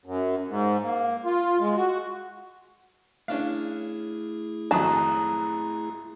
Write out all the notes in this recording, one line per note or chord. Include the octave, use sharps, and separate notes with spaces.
F#2
G#2
A#3
F4
G#3
F#4
A3 C#4 D4 E4 G#4 F5
G#1 F2 F#3 A5 A#5 D#6